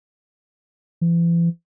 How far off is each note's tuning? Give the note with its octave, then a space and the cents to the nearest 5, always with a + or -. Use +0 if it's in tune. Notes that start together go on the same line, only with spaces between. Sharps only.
E3 +40